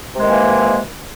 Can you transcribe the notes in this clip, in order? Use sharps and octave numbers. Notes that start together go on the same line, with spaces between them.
C3 D#3 E3 G#3 A#3